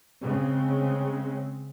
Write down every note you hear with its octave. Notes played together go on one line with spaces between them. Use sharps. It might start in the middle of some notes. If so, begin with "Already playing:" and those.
C#3 G#3 C4